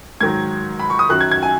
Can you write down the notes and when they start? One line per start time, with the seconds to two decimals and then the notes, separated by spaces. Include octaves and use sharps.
0.21 G#2 D#3 F#3 G#6
0.79 B5
0.90 C#6
0.99 D#6
1.09 F#2 D#3 F#3 F#6
1.20 G#6
1.31 G#6
1.43 G#5